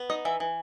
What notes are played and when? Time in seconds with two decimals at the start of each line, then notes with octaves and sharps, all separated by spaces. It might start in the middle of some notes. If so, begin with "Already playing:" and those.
Already playing: B3
0.10 D#4 D#5
0.25 E3 E5
0.40 E3